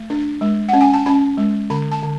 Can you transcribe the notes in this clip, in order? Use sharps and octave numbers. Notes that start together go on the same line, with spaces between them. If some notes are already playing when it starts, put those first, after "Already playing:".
Already playing: A3
D4
G#3
C#4 F#5
G#5
A5
C#4 B5
G#3
D3 B5
A5
D3